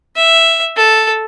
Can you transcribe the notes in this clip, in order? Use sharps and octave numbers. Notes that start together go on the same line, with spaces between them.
E5
A4